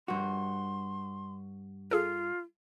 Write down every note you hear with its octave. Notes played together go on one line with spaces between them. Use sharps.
G2 F#4 C6
F4 G#4 A4